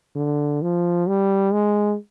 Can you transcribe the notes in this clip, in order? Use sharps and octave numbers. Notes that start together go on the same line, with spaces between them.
D3
F3
G3
G#3